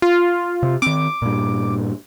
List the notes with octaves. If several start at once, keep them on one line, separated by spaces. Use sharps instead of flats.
F4
C3
D#3 C4 D6
G2 A#2